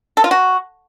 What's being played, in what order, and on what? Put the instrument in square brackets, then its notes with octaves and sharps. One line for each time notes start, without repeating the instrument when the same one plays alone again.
[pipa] A4
F4
F#4